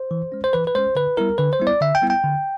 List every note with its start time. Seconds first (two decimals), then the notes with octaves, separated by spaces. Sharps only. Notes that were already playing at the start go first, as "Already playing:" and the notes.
Already playing: C5
0.11 E3
0.32 G#3 C#4
0.44 C5
0.53 E3 B4
0.67 B4
0.75 G#3 C#4 C5
0.95 D3 B4
1.17 G3 B3 E4 A#4
1.38 D3 B4
1.53 C5
1.60 G3 B3 E4
1.67 D5
1.81 D3 E5
1.95 G5
2.02 G3 B3 E4
2.10 G5
2.24 D3